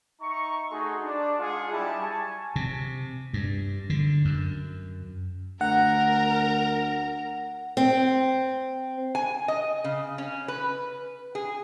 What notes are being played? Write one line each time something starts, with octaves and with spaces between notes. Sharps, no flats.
D#4 E5 A#5 C#6
A3 D#4 F#4 G#4 C6
D4 D5
G#3 D4 F4 G#4 D5 F#5
G3 E4 A5
G#5 A5 C#6
C3
G2
D3
F#2
D2 A#4 F#5 A#5
C4
G#5
D#5
C#3
C#4
B4
G#4